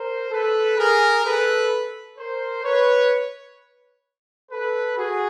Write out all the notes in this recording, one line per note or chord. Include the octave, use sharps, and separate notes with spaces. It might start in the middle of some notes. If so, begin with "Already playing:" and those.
Already playing: A#4 C5
A4 B4
G#4 A#4
A4 B4
A#4 C5
B4 C#5
A4 B4
F#4 G#4